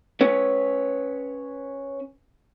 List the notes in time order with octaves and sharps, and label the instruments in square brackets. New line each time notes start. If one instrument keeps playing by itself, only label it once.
[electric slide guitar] C#4 B4 C#5